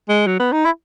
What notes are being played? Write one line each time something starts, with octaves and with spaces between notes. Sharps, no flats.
G#3
F#3
B3
D#4
E4